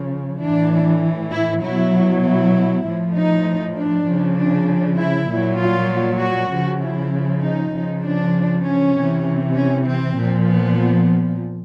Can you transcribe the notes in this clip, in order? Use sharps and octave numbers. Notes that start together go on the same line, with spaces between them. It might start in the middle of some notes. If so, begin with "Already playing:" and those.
Already playing: C#3 F3
A2 E3 D4
E4
B2 F#3 E4
E4
A2 F3
D#4
D4
C#3 F3
D4
E4
A#2 F#3
F4
F#4
C#3 F3
E4
D#4
C#3 F3
D4
C#4
C3 E3
C#4
C4
A#2 F3
B3